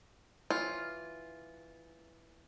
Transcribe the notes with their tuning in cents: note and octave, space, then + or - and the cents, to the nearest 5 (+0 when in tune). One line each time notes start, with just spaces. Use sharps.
E3 +0 F4 +0 C#5 +0